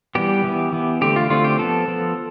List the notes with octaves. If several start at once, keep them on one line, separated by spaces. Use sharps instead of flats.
E3 G3 B3 G4
E3 B3
E3 B3
D3 A3 C4 G4
F4
D3 A3 C4 F4
G4
F3 B3 A4
F3 B3